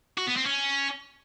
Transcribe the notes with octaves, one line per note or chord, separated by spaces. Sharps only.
F#4
B3
C4
C#4